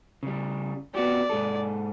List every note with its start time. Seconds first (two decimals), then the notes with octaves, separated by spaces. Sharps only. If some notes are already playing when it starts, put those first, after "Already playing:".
0.23 C#3 G3
0.95 B3 F#4 G4 D5
1.29 G#2 G#4 A4